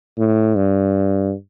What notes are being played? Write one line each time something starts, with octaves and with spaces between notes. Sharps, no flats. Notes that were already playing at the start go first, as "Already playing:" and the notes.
A2
G2